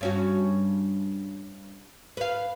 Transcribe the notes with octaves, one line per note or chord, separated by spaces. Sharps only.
G2 C#4 F#4
B4 F5